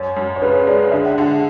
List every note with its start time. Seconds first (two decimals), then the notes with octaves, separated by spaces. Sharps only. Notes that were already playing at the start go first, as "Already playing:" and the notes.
Already playing: F#2 C#5
0.16 F#2
0.36 C#5
0.42 C#3 B4
0.67 G#3 D5
0.92 D3 E5
1.06 F#5
1.18 D3 E5